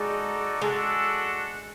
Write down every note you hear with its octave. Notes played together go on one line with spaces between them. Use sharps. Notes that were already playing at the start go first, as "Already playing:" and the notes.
Already playing: G#3 D#4 F#4 A4 D5
G#3 D4 F#4 A4